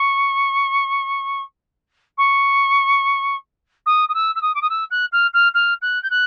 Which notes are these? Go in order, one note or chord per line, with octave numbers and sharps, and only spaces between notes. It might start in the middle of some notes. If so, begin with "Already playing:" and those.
Already playing: C#6
C#6
D#6
D#6
E6
E6
D#6
D6
D#6
E6
F#6
F6
F6
F6
F#6
G6
F#6